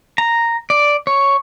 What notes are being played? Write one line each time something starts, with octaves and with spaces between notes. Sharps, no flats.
A#5
D5
C#5